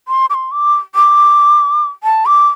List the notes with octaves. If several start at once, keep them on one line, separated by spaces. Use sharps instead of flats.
C6
D6
C6
D6
D6
A5
D6